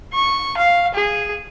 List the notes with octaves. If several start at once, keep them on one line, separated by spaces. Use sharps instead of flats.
C#6
F5
G#4